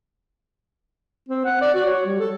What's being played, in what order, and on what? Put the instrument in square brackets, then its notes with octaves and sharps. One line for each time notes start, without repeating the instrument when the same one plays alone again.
[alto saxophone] C4
F#5
D5
F#4
C#5
G3
A4